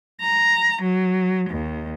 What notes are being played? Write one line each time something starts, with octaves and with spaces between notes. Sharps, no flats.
A#5
F#3
D#2